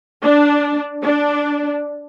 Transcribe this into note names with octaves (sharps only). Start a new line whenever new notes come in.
D4
D4